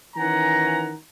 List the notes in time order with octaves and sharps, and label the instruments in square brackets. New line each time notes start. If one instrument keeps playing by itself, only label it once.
[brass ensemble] D#3 E3 C#4 F#5 G#5 A#5